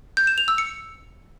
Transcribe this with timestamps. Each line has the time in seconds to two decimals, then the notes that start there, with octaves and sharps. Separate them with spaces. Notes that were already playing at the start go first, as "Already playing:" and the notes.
0.17 G6
0.27 E7
0.38 F7
0.48 E6
0.58 C#7